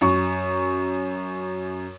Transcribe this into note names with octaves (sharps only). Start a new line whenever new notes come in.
F#2 C#6